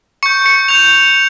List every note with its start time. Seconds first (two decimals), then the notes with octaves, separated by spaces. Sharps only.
0.23 C#6 G6 C#7
0.46 C#7
0.68 C#6 G6 F7
1.14 C#6